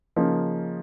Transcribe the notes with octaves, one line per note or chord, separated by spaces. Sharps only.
C#3 F3 A#3 D#4